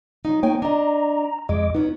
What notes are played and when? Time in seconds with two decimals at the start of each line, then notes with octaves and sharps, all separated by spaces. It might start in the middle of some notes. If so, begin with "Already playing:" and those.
0.25 F#3 D#4
0.43 A#3 D#4 C#5 G5 G#5
0.62 D4 D#5 A#5
1.49 F2 G#3 D#5 D6
1.75 B3 C#4 D#4